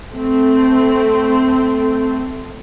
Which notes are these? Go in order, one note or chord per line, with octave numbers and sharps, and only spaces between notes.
A3 C4